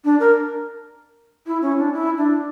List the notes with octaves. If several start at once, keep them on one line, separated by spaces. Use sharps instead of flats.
D4
A#4
E4
C#4
D4
E4
D4